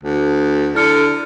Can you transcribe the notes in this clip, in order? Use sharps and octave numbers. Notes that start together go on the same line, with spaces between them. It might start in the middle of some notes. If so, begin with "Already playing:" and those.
D2
D3 E4 F6 C#7